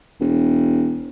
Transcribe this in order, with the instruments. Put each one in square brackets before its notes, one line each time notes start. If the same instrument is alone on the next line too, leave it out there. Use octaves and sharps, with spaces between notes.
[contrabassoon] E1